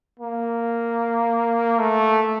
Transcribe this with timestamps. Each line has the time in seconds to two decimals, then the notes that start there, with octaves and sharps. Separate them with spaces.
0.19 A#3
1.80 A3